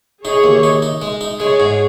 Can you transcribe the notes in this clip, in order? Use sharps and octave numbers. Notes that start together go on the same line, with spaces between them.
D#4 G#4 C#5
D#2
D#4
D#4
G#3
D#4
G#3 G#4 C#5
G#2